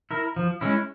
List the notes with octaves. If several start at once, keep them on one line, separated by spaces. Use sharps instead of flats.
E4 A#4
F3
G#3 C#4 E4